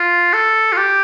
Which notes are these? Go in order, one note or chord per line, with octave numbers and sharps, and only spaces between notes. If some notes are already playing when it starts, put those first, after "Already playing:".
Already playing: F4
A4
F4
G4